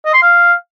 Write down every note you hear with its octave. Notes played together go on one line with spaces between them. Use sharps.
D#5
C6
F5